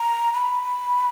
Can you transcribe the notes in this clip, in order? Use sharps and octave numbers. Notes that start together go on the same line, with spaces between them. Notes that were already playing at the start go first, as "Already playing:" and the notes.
Already playing: A#5
B5